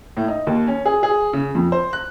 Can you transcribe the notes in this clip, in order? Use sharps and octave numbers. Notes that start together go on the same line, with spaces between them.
A2
D#4
D#2
C#4
G#4
G#4
C#3
F2
C5
F#6